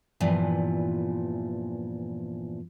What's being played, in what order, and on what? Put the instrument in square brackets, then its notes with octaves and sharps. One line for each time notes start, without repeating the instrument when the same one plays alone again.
[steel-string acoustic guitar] E2 G2 A#2 E3 F3